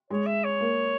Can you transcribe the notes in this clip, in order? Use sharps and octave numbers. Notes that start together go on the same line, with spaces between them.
G#3 C#5
E5
C#5
A#3